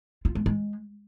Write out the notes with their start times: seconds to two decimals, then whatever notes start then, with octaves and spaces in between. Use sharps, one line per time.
0.25 F4
0.35 G#3
0.46 G#3